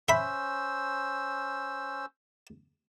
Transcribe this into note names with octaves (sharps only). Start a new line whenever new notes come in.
C#4 C5 E5 B5 E6